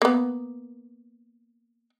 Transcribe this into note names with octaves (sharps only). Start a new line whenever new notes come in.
A#3 B3